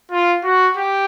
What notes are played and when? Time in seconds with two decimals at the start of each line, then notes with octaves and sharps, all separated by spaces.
0.12 F4
0.44 F#4
0.77 G4